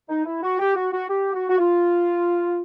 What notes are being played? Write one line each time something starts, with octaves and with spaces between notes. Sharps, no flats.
D#4
E4
F#4
G4
F#4
F#4
G4
F#4
F#4
F4